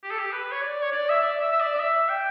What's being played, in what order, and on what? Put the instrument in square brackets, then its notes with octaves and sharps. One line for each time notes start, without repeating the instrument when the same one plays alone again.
[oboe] G4
A4
G4
B4
C#5
D5
C#5
D5
E5
D5
E5
E5
D5
D5
E5
G5